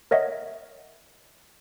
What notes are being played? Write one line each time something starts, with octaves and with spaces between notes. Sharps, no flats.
A#4 C#5 D#5 E5 F#5